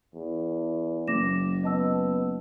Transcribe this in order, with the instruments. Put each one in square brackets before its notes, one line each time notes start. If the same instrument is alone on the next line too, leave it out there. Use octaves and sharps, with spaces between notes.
[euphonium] E2
[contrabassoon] F#1 [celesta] D6 A#6 E7
[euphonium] B3 [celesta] D#5 A5 E6